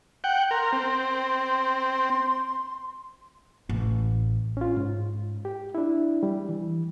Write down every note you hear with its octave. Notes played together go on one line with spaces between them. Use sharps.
F#5 G5
A#4 C6
C4
C6
A1
C#4 F4
G#2
G4
D4 E4
G3
E3